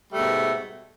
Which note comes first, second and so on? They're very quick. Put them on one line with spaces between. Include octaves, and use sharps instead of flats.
G3 A3 B2 G#2